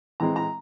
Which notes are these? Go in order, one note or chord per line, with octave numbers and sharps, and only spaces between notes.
E3 G#3 C4 A#5
A#5